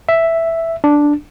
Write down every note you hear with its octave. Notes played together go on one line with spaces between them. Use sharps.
E5
D4